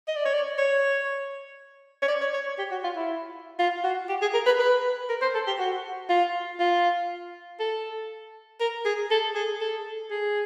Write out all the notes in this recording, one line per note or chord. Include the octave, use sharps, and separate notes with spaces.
D#5
D5
C#5
D5
C#5
C#5
D5
C#5
C#5
G4
F#4
F4
E4
F4
F#4
G4
G#4
A#4
B4
B4
A#4
C5
A4
G4
F#4
F4
F4
A4
A#4
G#4
A4
G#4
A4
G#4